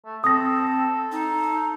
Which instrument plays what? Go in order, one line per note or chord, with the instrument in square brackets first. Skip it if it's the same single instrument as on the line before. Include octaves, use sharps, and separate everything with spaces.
[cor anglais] A3
[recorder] C4 [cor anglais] A4 [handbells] D#6 A#6
[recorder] D#4